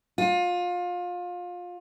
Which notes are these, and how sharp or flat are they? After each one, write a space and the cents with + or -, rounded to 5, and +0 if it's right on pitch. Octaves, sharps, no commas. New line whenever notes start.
F4 +25